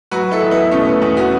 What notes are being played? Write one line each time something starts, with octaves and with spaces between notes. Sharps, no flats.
F#3 F#4 B4
E4 A4
E2
B3 E4
B2 A3 C#4
B3
E2 B3
C#4 F#4